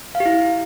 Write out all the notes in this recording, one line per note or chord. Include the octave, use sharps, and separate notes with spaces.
F5
G4
E4